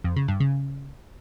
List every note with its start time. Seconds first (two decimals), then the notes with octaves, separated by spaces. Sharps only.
0.04 F2
0.16 C#3
0.28 G2
0.40 C#3